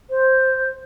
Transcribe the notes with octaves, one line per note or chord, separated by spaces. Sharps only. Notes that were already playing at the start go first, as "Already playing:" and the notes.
C5